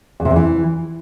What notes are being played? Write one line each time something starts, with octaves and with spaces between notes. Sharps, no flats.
E2
C3
E2
E3